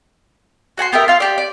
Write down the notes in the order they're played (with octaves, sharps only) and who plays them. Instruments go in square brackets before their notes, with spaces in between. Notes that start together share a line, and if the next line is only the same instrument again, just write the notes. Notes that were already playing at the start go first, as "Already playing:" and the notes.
[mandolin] F#4 F#5 G#5 C6
B3 G4 A#4 E5
F4 F5
G4 D5
D5